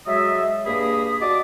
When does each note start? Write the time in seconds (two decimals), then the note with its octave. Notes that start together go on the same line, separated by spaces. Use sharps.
0.06 F#3 G#3 G#4 A4 D#5 E5
0.65 G2 A#3 G#4 B5 D#6
1.21 F#4 D5 D#5 A5 D6